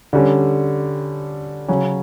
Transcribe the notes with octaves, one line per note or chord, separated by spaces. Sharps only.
D3 G3 C#4
C#3 F#3 C#4